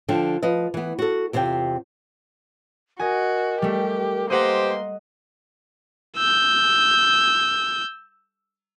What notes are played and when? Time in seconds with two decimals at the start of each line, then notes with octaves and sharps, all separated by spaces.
0.09 D3 F3 D4 G5
0.43 F3 B4 D#5
0.74 E3 B3
0.99 F#4 A4
1.33 E2 C3 F4 C5 G5
2.99 F#4 A#4 D#5 G#5
3.62 G3 A3 G4
4.30 A#3 G4 B4 C5 D#5 F#5 C6 A#6
6.17 E6 G6